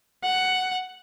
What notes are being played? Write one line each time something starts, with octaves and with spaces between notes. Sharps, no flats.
F#5